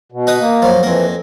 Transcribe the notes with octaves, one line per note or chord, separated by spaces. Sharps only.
B2
D#4 B4 D#6
A#3
F#2 F3
F2 E3 F3 A#3